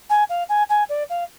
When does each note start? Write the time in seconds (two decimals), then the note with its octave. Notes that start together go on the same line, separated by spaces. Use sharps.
0.10 G#5
0.29 F5
0.49 G#5
0.69 G#5
0.89 D5
1.10 F5